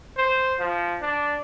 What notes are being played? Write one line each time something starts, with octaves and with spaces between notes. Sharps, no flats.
C5
F3
D4